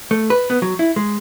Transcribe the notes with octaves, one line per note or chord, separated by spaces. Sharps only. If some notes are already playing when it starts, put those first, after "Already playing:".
A3
B4
B3
F#3
E4
G#3